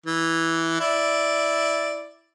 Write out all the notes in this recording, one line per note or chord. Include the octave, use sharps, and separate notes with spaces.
E3
E4 D5